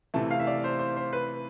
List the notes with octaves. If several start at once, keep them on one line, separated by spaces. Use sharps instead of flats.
C3 E3 A3 A5
F5
E5
D5
C5
C5
C5
B4